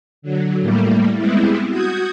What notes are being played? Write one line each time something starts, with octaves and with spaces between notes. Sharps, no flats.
D3 F#3
A2 G3 A3 A#3
G3 G#3 B3 C4 E4
F#4 D#6 G6 G#6